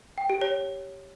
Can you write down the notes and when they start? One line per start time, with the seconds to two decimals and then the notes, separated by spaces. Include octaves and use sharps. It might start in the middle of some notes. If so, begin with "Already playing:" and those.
0.18 G5
0.30 G4
0.41 C#5